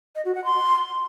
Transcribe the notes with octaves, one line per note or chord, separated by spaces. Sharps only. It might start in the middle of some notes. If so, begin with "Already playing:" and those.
D#5
F#4
F#5
C6